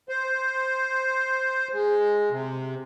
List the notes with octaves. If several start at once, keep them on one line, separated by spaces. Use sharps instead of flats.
C5
G#3
C3